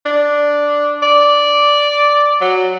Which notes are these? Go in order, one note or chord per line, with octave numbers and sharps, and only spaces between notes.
D4
D5
F#3